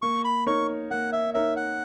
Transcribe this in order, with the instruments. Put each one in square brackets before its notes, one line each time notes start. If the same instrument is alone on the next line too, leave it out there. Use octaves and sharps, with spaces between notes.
[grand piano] A#3 [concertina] C#6
[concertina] B5
[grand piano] D#4 A#4 C#5 [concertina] C#6
[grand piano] A#3 [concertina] F#5
[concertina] E5
[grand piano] D#4 A#4 C#5 [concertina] E5
[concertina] F#5